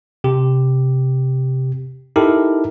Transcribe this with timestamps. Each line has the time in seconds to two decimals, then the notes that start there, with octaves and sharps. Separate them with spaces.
0.24 C3 G4
2.16 D#4 E4 G4 A4 A#4